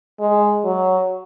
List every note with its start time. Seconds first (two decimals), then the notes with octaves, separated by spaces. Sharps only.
0.20 G#3
0.64 F#3